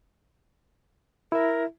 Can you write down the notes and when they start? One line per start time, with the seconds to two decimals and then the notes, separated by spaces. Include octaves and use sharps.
1.32 E4 A#4 E5